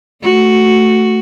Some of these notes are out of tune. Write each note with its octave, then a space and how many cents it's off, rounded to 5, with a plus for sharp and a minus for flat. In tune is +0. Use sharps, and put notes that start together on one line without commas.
A3 +0 F#4 +0